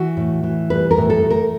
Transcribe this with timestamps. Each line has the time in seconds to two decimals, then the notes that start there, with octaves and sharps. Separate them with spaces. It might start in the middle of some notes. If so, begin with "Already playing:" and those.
Already playing: E3 F#4
0.17 A2
0.44 E3
0.70 G3 B4
0.91 A#4
0.98 A2
1.10 A4
1.23 A2
1.30 A#4